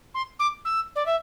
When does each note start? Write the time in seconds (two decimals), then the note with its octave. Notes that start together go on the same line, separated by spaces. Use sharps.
0.14 C6
0.39 D6
0.65 E6
0.95 D5
1.06 E5